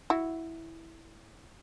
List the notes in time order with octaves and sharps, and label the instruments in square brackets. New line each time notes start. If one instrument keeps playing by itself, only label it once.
[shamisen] E4 F#4